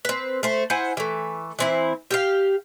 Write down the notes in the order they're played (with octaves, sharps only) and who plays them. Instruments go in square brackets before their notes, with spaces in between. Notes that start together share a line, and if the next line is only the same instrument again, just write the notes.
[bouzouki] C4 B4
A3 C5
E4 C5 F#5 G#5
E3 A3
E3 C4 E4
G4 E5 F5